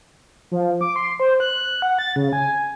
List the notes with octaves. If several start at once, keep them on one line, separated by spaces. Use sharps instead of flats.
F3
D6
C6
C5
F#6
F#5
A6
C#3
G#5